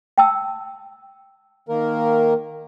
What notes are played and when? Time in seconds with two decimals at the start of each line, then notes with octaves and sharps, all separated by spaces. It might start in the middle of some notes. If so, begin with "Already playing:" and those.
0.18 G5 A5 E6
1.69 D#3 A#3 A#4